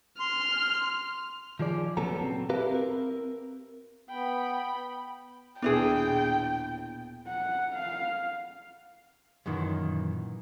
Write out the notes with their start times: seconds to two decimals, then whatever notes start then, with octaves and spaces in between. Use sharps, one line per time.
0.20 C6 F6
1.59 D#3 F3 G#4 D5
1.97 A#2 C#3 F#3 B3 A4 A#5
2.21 C4
2.50 E4 F#4 G4 A#4 B4 F5
2.71 C4 A#4
4.09 B3 G5 B5
5.62 D#1 B2 B3 D4 E4 G#4 G5
7.27 F#5
7.74 F5
9.46 F#2 A#2 D#3 E3